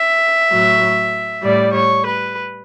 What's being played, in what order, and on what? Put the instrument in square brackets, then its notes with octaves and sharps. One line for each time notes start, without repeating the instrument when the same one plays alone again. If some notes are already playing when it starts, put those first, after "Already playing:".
Already playing: [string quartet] E5
A2 F#3
A2 G3 D5
C#5
B4